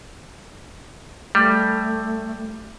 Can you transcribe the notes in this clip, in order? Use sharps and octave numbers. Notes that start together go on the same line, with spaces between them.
G3 A3